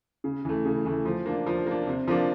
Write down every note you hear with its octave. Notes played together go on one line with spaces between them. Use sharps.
C#3
E3 A3
C#3
E3 A3
F3
A#3 D4
F3
A#3 D4
C3
F3 A#3 D4